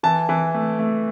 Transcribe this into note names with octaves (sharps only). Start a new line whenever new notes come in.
E3 A5
E3
A3
A3